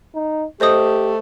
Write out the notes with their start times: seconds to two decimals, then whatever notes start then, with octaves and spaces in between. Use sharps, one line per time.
0.15 D#4
0.61 A3 G4 C5 D#5 D#6